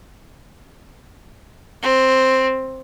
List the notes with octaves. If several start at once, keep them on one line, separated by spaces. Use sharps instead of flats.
C4